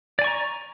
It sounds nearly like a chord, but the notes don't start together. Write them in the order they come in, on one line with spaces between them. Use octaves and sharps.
D5 G#5 C#6 A#5